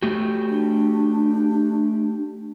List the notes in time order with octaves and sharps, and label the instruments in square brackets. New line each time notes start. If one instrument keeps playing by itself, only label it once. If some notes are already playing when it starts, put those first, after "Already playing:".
[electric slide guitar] A3 F#4 G4
[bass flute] D4